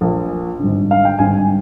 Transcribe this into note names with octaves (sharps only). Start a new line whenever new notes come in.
A#1 A#2
G#1 G2 D3
F5
G5
G#1 G2 D3 G#5